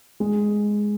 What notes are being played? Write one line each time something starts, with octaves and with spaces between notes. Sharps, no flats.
G#3